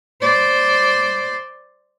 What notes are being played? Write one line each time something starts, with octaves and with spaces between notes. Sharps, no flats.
C5 D5